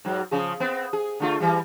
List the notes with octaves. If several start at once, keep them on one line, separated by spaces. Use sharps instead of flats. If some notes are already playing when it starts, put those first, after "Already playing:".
G#2 F#3
C#3 F3 G#4
B3 C4
G#4
D3 A3 F4
E3 G3